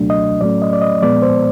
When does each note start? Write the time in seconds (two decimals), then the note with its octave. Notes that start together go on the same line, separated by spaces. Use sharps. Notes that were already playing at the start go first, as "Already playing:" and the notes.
Already playing: C#2 B2 F#3 A3 D4
0.10 D#5
0.41 A2 F#3 A3 C#4 D5
0.62 D#5
0.73 D5
0.82 D#5
1.02 A#2 F3 G#3 B3 D5
1.22 C5